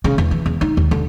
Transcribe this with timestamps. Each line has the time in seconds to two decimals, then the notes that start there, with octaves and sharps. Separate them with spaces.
0.04 C#3
0.18 E2
0.31 E3
0.46 E2
0.61 D#4
0.77 D#2
0.91 D3